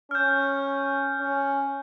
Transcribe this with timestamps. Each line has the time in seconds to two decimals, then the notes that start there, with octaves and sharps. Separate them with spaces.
0.11 C#4 F6 G6
1.20 C#4